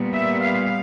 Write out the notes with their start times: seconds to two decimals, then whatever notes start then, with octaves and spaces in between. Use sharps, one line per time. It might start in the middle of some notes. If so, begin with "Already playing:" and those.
Already playing: A#2 G3 B3
0.13 E5
0.43 F5